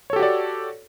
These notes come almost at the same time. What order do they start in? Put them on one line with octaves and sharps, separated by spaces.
C#5 A4 G4 F#4 D5